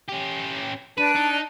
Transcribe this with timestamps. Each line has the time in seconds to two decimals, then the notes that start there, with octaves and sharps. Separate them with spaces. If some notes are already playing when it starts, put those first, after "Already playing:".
0.08 C#4 G4
0.98 D4 B4 A5 F#6 D#7
1.16 D#4